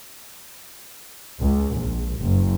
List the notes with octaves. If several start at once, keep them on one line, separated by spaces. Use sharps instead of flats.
C#2
A#1
F#1